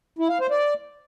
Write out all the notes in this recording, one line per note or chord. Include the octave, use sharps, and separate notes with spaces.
E4
F5
C5
D5